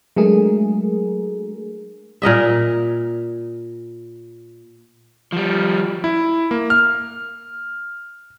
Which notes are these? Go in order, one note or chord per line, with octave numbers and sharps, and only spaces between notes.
F#3 G#3 A3 D4 G#4 A#4
A#2 A#4 D#5 E5
F3 G3
E4
A#3
F6